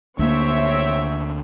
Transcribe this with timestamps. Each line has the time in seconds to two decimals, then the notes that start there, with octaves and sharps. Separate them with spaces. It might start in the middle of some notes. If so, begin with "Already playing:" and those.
0.19 D2 A#3 C4 C#5 E5